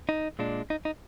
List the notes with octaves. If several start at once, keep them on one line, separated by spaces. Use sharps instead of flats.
D#4
A#2 G#3 D4
D#4
D#4